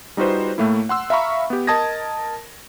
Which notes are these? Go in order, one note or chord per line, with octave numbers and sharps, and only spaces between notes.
G3 D#4 F4 F#4 B4 C5
A2 A3 A#3 E4
F#5 C6 E6
E5 F5 A#5 B5 C#6
B3 G4
A#4 D#5 A5 D#6 G#6 A#6